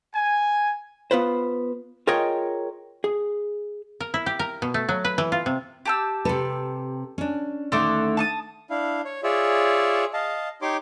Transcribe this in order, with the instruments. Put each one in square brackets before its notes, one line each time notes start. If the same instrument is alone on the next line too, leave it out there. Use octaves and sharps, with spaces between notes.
[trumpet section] G#5
[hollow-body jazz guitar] B3 F4 B4 C5
F4 G#4 A#4 C#5 D#5 G5
G#4
[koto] A#4
E4
G4
A#4
B2
A3
F#3
B4
E3
F4
C3
[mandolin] G4 A5 E6
[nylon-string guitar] C3 B4 [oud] A4
[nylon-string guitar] C#4 D4
[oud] D#2 D3 A3 [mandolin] A4 C6 D6
[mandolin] A5 C#6 D#6
[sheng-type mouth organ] D4 E4 F5
C#5
F4 G#4 C#5 D5 E5
D#5 F5 A5
D#4 G4 C#5 C6 D6